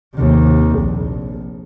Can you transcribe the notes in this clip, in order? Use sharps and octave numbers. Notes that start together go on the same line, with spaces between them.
D#2 C3
A#1